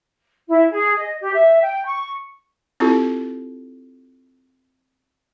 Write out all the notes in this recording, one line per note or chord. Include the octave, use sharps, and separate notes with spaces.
E4
G#4
D#5
G4
E5
G5
C#6
C4 E4 F4 G4 A4